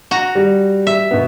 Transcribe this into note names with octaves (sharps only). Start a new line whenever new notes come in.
F#4 A#5
G3
E5
B2 B3